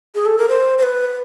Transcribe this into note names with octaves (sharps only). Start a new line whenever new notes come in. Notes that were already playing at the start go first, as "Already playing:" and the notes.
G#4
A4
A#4
C5
C5
B4